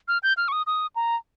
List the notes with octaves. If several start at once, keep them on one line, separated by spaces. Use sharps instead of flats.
F6
G6
F6
C#6
D#6
D#6
A#5